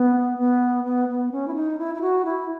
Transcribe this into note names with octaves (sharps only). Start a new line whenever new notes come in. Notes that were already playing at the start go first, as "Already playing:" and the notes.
Already playing: B3
B3
B3
B3
C#4
E4
D#4
E4
E4
F#4
E4